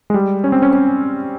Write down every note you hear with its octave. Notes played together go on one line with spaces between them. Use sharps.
G#3
G3
C#4
C4
C#4
C#4